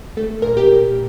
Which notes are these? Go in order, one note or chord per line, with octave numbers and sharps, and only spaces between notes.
A3 A4
A#2 A#4
G4